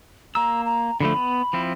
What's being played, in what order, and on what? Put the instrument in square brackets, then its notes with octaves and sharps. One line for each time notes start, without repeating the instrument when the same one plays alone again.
[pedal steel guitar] A#3 E6 [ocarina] A#5
[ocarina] A#5
[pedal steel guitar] D3 F3 A3 [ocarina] B5
[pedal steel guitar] B3
F3 C4 E4